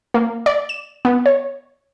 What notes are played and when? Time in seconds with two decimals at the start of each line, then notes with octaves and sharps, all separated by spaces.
0.14 A#3
0.46 D5
0.69 E7
1.05 B3
1.26 C#5